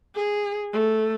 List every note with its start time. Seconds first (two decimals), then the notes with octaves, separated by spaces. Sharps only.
0.15 G#4
0.73 A3